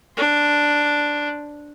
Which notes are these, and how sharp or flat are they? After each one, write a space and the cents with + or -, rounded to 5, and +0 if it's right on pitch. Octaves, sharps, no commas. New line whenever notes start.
D4 +0 C5 +0